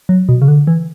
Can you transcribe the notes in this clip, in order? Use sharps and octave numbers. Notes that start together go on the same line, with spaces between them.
F#3
B2
C#3
D3
E3